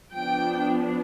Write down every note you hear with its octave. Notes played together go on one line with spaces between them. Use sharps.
F3 B3 D4 G5